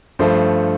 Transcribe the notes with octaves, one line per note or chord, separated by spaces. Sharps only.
G2 F3 A3 C5